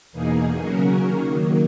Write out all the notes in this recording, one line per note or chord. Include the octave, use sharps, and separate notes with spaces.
E2 B2 A#3 D#4 G#4
C#3 F#3 C#4 F#4 A#4
D#3 F#3 A#3